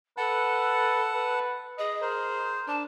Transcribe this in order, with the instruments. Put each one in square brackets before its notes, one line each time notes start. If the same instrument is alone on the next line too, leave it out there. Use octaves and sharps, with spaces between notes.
[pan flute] A4 [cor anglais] B4 [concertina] F#5 A5
[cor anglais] B4
[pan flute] G#4 [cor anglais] D#5
[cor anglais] A#4 [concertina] C5
[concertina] D4 [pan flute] A5